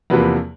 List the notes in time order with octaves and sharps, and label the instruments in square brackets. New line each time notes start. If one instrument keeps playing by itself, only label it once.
[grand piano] E2 C3 F3 A#3 B4